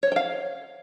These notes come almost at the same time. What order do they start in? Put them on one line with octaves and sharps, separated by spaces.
C#5 C5 G5 F5